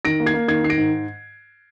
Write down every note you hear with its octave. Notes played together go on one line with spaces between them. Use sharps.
D#3 A#6 D7
A#3
G#6 C7
A#3
D#3 G#6 C7
D#3 C7
A#6 D7
G#2